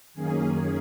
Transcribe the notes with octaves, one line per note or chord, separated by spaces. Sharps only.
F#2 D#3 A#3 C#4 G#4